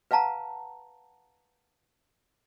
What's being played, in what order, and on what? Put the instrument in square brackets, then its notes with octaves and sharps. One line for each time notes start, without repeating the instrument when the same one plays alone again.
[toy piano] B4 F5 F#5 A5 A#5